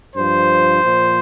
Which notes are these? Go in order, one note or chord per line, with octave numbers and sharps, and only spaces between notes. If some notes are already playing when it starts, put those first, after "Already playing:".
G2 F3 C5
A#2 F3